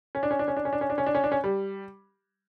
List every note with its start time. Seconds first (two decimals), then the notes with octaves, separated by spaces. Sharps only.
0.15 C#4
0.23 D4
0.31 C#4
0.39 D4
0.48 C#4
0.57 D4
0.65 C#4
0.73 D4
0.81 C#4
0.90 D4
0.98 C#4
1.07 D4
1.15 C#4
1.24 D4
1.32 C#4
1.44 G3